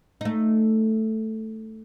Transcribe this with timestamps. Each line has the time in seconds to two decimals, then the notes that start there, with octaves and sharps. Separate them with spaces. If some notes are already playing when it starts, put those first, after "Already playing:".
0.21 A3 D#4